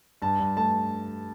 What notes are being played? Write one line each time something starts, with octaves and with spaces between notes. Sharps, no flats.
G2 A5
G2
A3 A5